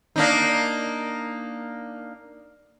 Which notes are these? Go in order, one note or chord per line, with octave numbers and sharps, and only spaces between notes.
A#3 D4 D#4